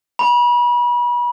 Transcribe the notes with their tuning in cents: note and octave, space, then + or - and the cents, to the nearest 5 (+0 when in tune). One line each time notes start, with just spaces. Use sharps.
B5 -35